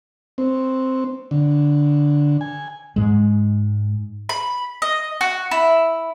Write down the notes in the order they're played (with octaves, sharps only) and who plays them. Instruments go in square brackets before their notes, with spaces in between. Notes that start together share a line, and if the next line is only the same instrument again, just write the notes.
[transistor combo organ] C4
D3
G#5
[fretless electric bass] G#2 G#3
[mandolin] B5
D#5
F#4
E4